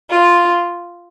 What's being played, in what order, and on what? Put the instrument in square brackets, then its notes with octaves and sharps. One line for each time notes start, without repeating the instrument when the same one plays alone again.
[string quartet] F4